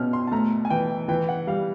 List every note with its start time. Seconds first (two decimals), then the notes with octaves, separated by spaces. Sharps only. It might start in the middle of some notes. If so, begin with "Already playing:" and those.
Already playing: B2 C#4 F6
0.13 C6
0.27 A5
0.32 A3 A#5
0.65 G#5
0.70 E3 G5
1.08 E3 G5
1.29 F#5
1.47 G3 F5